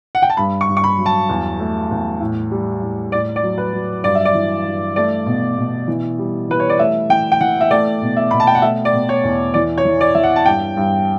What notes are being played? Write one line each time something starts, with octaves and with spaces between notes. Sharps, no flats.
F#5
G5
A5
G2 B5
C#6
G2
C#6
B5
F#3
A5
E2
A3
E2
A2
G3
A2
A2 D5
D5
F#3
B4
F#3
G2 D5
E5
D5
E3
G2
A3 D5
B2
B2
E3
G3
E3 B4
C#5
D5
A3 E5
E3 G5
G5
E3 F#5
E5
A3 D5
B2
E5
B2 B5
A5
G5
F#5
A3 E5
D5
B2
C#5
E2
E3 D5
C#5
E3
D5
E3 E5
F#5
A5
G2 G5
G2